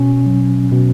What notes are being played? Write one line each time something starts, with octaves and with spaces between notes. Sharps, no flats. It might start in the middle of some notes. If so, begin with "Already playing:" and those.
Already playing: B2 C#4
F#3
B2